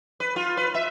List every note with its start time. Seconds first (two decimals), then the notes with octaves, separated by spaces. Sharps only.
0.20 B4
0.36 F4
0.57 B4
0.74 E5